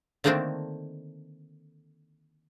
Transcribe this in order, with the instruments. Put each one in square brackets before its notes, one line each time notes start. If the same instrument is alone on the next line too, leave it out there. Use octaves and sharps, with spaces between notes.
[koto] D3 D#3 A3 A#3 C4 D4